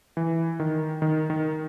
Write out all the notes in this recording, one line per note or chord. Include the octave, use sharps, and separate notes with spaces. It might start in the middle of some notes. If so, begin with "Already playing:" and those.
E3
D#3
D#3
D#3